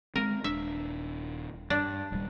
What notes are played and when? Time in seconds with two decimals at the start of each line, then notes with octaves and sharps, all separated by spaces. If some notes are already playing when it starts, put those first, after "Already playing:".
0.16 G#3 C4 A#4
0.44 D#1 D4 E5
1.70 G2 D4
2.12 D#1 G3